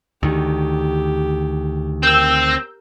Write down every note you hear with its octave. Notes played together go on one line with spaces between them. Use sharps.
D2 D#3 G4
C4 A#4 E6 G6